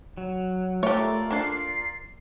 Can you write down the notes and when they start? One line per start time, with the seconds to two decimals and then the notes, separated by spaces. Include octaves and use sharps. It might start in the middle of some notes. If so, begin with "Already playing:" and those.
0.17 F#3
0.83 A3 F4 G4 A#4 C#5 D5
1.31 A#3 D4 A4 C7